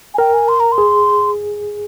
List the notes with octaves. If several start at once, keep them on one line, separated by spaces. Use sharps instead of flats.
G#5
A#4 G5
G#5
C6
A#5
C6
G#4